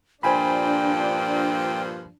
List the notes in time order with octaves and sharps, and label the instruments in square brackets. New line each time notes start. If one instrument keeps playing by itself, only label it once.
[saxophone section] G2 A#2 F3 [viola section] D4 [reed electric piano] C5 G#5 B5 [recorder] G5